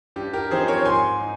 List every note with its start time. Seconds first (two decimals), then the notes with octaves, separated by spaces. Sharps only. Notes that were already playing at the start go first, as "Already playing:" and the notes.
0.16 G2 G4
0.33 G4 A#4
0.51 F3 C4 D#4 G#4 C5
0.68 A#4 C#5
0.85 G#2 G#5 C6
1.21 D#4